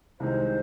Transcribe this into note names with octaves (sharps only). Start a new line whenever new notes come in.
C2 C3 D#3 G#3 D#4 C5